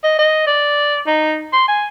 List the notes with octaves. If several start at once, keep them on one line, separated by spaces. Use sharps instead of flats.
D#5
D#5
D5
D#4
C6
G#5